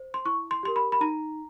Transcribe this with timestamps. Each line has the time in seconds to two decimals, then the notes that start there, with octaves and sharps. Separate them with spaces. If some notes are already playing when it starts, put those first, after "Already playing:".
Already playing: C5
0.14 C6
0.25 E4 C#6
0.51 C6
0.63 G4 A#4 C6
0.76 B5
0.92 B5
1.01 D#4 A#5